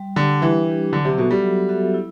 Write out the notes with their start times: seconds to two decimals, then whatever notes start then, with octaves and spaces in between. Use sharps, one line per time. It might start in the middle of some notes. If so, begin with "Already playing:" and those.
Already playing: G3
0.16 D3 D4 G4
0.42 E3 G3
0.68 D4 G4
0.93 D3 F#3
1.05 C3
1.18 B2 B3 F#4 A4 E5
1.31 G3
1.43 F#3
1.69 B3 F#4 A4 E5
1.94 E4